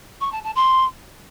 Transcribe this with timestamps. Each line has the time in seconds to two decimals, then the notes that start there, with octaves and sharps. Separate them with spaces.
0.20 C#6
0.32 A5
0.43 A5
0.55 C6